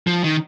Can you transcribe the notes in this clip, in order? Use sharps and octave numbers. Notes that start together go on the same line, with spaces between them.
F3
D#3